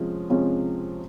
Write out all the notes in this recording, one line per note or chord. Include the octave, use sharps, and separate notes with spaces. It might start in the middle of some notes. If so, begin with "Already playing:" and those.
Already playing: C3 F3 G#3 C#4
C3 F3 G#3 C#4